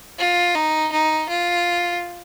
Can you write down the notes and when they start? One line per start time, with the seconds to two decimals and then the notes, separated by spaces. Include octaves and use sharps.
0.19 F4
0.55 D#4
0.92 D#4
1.29 F4